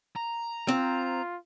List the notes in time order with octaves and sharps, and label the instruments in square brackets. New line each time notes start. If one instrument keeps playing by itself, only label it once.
[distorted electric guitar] A#5
[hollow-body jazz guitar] C4 [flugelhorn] F4